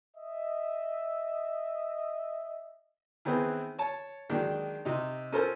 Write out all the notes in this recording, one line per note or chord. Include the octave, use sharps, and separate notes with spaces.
D#5 E5
D#3 E3 B3 C4 G#4 B4
C#5 A5
D#3 F#3 G#3 A#3 D4 G4
C3 D#4
C#4 F4 A4 A#4 C5